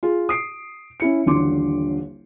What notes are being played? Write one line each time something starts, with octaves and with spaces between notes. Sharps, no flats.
F4 G#4
D#6 C7 D7
C#4 E4 C#7
D#1 A1 D3 C6 D6